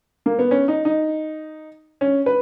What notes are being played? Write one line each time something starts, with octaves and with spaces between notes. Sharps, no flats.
A#3
B3
C#4
D#4
D#4
C#4
B4